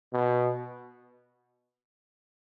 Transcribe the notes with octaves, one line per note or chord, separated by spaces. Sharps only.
B2